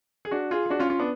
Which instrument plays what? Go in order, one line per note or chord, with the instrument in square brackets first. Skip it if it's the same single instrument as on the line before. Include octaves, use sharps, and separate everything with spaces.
[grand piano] G#4
D4 F#4
F4 G#4
G#4
D4 F#4
C#4 F4
C#4 F4
B3 D4